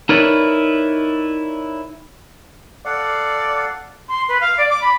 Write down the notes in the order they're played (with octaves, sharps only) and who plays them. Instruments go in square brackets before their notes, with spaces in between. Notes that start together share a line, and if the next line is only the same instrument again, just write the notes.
[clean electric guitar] D#4 E4 A#4 B4 C#5 D5
[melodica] A4 F5 F#5 [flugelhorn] D5
[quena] C6
B4
F5
D5
D6
B5